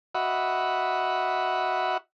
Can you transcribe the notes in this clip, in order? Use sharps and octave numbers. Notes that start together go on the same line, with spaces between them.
F#4 D#5 E5 F#5 B5